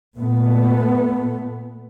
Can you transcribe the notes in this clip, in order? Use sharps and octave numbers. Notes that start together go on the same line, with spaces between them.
A#2 A3 B3